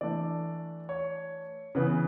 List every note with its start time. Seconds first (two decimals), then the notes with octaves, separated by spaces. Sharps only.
0.01 E3 A3 D4 D5
0.89 C#5
1.75 C#3 E3 B3 B4